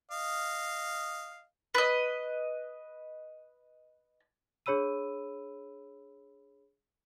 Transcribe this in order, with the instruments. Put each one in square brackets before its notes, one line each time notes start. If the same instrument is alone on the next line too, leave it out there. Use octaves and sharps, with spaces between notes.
[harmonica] D#5 F5
[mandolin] B4 D#5
[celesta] D4 G#4 C#5 B5 E6 D#7